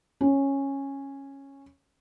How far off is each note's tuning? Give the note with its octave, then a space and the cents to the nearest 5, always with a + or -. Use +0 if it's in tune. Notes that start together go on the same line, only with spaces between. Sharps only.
C#4 -10